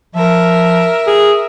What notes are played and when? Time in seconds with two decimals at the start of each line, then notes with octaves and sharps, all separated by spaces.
0.15 F3 A#4 E5
1.07 G#4